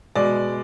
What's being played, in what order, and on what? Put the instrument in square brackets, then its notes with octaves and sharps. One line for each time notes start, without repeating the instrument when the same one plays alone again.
[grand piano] B2 G#3 D5